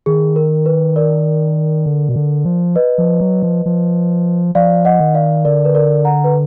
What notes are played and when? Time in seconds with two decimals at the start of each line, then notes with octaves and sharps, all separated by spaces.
0.06 D#3 G#4
0.36 A#4
0.66 B4
0.96 A#4 D5
1.86 D3
2.09 B2
2.16 D3
2.45 F3
2.76 B4 D#5
2.98 F3
3.21 F#3
3.43 F3
3.66 F3
4.55 F3 D5 F5
4.85 D#5 F#5
5.00 D#3
5.15 D5 F5
5.45 D3 A#4 D5
5.65 B4
5.75 A#4 D5
6.05 F#5 A#5
6.24 B4